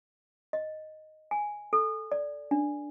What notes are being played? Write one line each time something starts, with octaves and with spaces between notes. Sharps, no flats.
D#5
G#5
A4
D5
D4